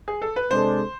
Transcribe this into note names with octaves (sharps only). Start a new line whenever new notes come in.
G#4
A4
B4
C3 G#3 D4 A4 C5